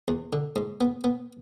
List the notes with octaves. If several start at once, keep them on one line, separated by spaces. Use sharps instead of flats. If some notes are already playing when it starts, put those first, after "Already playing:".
E2
D3
G#2
B3
B3